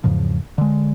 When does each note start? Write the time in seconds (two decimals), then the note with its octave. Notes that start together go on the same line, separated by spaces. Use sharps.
0.04 E2 G#2 C#3 F3
0.58 D3 G#3